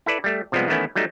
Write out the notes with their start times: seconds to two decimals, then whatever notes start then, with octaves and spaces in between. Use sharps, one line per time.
0.06 E4 A4 B4 D5
0.24 G3 A3
0.52 C3 F3 G3 G#3 B3
0.68 D#3 E3 A3 B3 C#4 E4
0.96 F#3 G3 A3 D#4